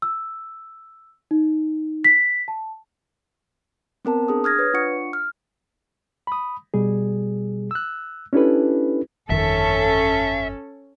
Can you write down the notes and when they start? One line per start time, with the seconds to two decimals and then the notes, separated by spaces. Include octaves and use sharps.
0.02 E6
1.31 D#4
2.04 B6
2.48 A5
4.05 B3 C4 A#4 A5
4.28 D4 G#4 D#6
4.44 D#6 F6 G#6 A#6
4.59 B4 C#5
4.74 D4 F4 F#5 C#6 C#7
5.13 F6
6.27 B5 D#6
6.74 B2 G3 G#4
7.71 E6 F#6
8.33 C#4 D4 E4 G4 A4 B4
9.30 G1 F2 D#3 C#4 A4 E5